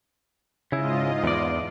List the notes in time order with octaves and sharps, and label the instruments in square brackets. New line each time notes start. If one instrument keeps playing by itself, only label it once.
[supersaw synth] G#2 F4 D#5 [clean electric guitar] C#3 E4
[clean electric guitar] E2 D5